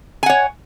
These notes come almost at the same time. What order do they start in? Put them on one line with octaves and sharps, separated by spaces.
G#5 F#5 C#5